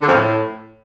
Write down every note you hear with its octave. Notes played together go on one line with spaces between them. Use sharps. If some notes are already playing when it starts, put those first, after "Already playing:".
D3
F2
A2